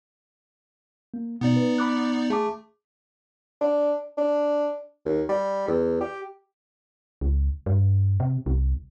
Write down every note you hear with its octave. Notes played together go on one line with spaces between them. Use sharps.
A#3
B2 B3 D#4 D5
B4
B5 D6 F#6
A3 G#4 A5 D6
D4
D4
D#2
G3
E2
G4
C#2
G2
C3
C2